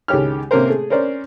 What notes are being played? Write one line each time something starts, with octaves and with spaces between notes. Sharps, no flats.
C#2 D#3 G#3 G4 C#5 F6
C3 A#3 C#4 A#4 C5
A3 G#4
C#4 A#4 C5 D5